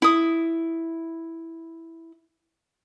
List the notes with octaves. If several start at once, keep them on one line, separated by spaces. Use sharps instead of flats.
E4 D#6